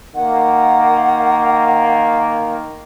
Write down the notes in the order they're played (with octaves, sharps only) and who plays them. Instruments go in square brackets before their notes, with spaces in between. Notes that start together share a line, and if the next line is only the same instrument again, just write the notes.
[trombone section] D#3 A#3 [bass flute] F#5